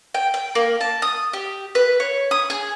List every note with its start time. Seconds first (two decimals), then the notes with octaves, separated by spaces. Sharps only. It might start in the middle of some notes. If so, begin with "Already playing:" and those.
0.14 G5
0.34 G5
0.55 A#3
0.81 A5
1.02 D#6
1.33 G4
1.75 B4
2.00 C#5
2.31 D#6
2.50 G#4